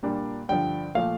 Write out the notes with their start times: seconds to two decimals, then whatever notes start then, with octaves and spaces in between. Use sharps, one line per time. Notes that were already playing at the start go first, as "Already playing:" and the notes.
0.03 A#2 G3 A#3 D4
0.49 G2 D3 F3 G5
0.95 A#2 F3 A3 F5